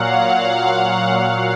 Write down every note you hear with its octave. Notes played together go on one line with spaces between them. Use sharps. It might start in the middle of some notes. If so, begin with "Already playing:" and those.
Already playing: A#2 F#3 F5 F#5
F#5
F5